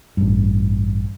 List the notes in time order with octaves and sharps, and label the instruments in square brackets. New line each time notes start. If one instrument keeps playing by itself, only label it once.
[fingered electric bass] A1 G2